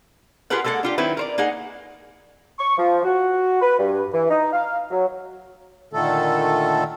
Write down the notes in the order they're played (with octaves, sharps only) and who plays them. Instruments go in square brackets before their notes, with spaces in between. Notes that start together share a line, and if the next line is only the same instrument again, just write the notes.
[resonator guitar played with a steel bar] F4 G4 G#4 A#4 B4 F#5
G#3 A#3 A4 B4 F#5
D4 F4 G4
D#3 F#3 C4 E4 B4
A#4 C5 D5
A#3 D#4 G#4 F#5
[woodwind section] C#6
F3
F#4
B4
G2
E3
D#4
F5
F#3
[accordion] A#2 D3 D#3 A3 A4